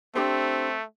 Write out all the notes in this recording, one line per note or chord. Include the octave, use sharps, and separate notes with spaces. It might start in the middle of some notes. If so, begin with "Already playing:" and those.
A3 C4 D4 G4 C5